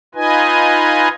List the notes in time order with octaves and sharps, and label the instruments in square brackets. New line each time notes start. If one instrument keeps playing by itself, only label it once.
[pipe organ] D#4 F4 B4 D#5 G#5